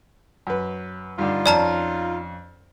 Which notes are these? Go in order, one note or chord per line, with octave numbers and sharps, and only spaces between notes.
F#2 B4
G2 D3 D#4 F4
F2 C#4 D5 A5 A#5 F6